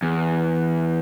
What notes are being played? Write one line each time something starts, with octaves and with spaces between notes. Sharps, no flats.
E2